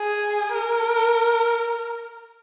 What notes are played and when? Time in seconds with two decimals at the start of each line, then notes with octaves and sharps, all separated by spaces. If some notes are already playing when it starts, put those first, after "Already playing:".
Already playing: G#4
0.54 A#4